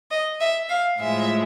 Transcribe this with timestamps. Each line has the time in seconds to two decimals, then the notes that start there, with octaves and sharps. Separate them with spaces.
0.11 D#5
0.40 E5
0.69 F5
0.99 A2 F3 G#3 E5